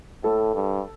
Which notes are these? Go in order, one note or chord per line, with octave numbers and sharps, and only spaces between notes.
A2 A4
G2